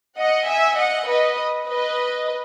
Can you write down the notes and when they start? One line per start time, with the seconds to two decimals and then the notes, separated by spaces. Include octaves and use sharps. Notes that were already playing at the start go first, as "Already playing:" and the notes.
0.19 D#5 F#5
0.49 E5 G#5
0.78 D#5 F#5
1.09 B4 D#5
1.68 B4 D#5